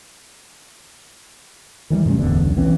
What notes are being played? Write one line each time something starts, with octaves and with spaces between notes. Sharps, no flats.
D#3 E3 F#3 G3
G2 C3 A3 C#4
D1 E2 D3
C#2 F#3
B1 E3 C4 C#4